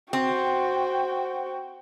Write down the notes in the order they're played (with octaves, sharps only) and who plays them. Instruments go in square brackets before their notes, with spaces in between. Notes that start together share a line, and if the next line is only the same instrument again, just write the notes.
[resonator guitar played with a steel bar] C4 [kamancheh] F#4 G5